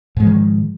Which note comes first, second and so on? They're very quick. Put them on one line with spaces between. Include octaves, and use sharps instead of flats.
G#2 G#3 F3 D#3